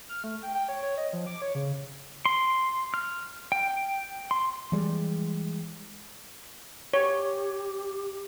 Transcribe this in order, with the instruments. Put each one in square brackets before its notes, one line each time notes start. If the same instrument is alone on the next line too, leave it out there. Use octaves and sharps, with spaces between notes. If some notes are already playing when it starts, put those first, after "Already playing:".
[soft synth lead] F6
A3
G5
G5
C#5
C#5
D#5
F3
D6
C#5
C#3
[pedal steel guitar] C6
F6
G5
C6
[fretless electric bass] E3 G3 G#3
[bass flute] G4 [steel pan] C#5